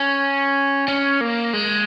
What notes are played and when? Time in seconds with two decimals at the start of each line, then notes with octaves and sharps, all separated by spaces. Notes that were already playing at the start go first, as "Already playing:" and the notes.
Already playing: C#4
0.88 C#4
1.21 A#3
1.53 G#3